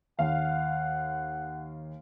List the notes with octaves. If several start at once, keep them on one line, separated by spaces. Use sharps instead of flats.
D#2 F5 F#5